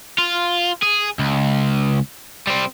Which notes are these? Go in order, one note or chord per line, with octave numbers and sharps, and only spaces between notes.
F4
G#4
C#2
G3 C4